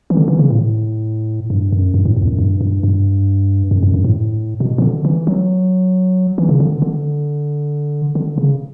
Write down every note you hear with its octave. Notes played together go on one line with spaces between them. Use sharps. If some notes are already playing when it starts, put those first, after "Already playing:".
E3
D3
E3
C#3
A2
G2
F#2
G2
A2
F#2
E2
F#2
G2
G2
G2
F#2
F#2
G2
A2
B2
E3
D3
E3
F#3
E3
C#3
D3
D3
D3
C#3